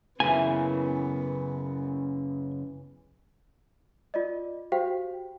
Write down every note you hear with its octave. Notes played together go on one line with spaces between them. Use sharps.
F#2 C#3 E3 B3 G#5
F4 D5 D#5
F#4 G4 C5 F5 G5